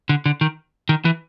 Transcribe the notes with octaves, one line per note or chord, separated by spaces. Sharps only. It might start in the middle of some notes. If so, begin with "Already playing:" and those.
D3
D3
D#3
D#3
E3